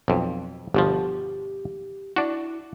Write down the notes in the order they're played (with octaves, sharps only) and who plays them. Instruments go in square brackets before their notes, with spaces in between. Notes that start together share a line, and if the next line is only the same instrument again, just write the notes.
[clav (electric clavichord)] B1 F2
[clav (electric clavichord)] G1 B2 F3 [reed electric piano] G4
[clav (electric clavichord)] D4 F#4 [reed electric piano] E4